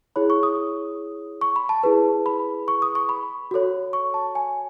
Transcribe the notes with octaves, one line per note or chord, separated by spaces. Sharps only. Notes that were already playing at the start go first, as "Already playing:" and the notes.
E4 G#4 C#5 B5
C#6
D#6
C#6
B5
A5
E4 G#4 B4
B5
C#6
D#6
C#6
B5
F#4 A4 C#5
C#6
A5
G#5